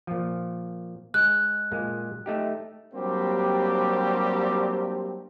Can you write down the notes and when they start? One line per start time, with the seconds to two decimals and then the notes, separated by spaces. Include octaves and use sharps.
0.07 A#2 F3
1.14 G#3 F#6
1.72 A#2 G#3 A#3
2.26 A3 D#4 G4
2.94 F#3 G3 A#3 C4 D4 G4